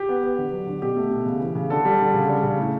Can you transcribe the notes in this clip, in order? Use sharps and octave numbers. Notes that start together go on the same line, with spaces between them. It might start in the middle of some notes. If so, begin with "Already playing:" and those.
Already playing: G4
B3
B3
D3
F#3
D3
B2 G4
A3
B2
C#3
E3
C#3
D3 A4
G3
D3
C#3
G3
C#3
A2